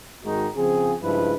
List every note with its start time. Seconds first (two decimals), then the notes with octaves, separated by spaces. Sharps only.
0.24 G#1 D#3 G#3 D#4 F#4
0.56 C#3 F3 C4 G#4
1.03 G2 C#3 F3 G#3 E4 B4